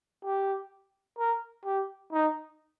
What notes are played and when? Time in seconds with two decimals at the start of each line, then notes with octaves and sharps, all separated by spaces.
0.25 G4
1.19 A#4
1.65 G4
2.13 D#4